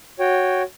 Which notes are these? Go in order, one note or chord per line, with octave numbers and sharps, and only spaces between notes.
F#4 C#5 G5